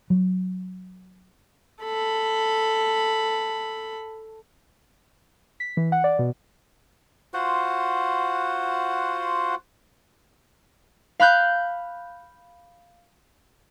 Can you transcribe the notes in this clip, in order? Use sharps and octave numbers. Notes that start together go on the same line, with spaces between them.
F#3
A4 B5
B6
E3
F#5
D5
B2
F4 F#4 C5 F#5
F5 B5 F#6 G6